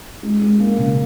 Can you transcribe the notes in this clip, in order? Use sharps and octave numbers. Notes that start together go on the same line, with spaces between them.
G#3
G#3
A#3
C#3